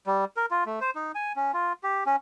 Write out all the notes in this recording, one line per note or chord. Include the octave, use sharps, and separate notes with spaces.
G3
A#4
F4
A3
C5
D#4
G#5
C#4
F4
G4
C#4